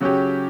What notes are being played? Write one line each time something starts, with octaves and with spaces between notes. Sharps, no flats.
C#3 F#3 C#4 G4